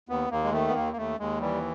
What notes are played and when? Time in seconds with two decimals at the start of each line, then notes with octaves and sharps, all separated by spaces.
0.09 D#2 B3
0.30 D#2 A#3
0.44 G#3
0.52 D#3 A3
0.68 B3
0.75 D#2 A#3
0.93 A#3
0.96 D#2 A3
1.19 D#2 G#3
1.41 E3 G3